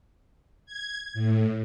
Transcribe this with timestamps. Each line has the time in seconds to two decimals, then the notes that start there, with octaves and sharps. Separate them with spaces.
0.66 G#6
1.14 A2